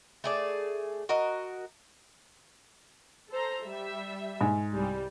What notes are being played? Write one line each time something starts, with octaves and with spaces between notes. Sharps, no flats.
A3 G#4 D5
F#4 A#4 D#5
A4 C5 A#5
G3 E5
G#2
C2 G3